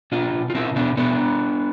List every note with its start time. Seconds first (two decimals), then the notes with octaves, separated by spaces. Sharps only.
0.12 B2 D4 F4
0.33 B2
0.50 F4
0.54 B2 C4 E4
0.76 B2 B3 D4
0.97 B2 B3 D4